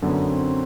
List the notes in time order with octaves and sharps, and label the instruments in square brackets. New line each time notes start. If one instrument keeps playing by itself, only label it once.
[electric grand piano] F#2 D3 F#3 [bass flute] B3
[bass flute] C4